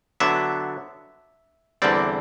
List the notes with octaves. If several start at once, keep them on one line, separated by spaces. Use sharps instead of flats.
D3 F#3 B3 D4 E5
E2 D3 G3 C4 D5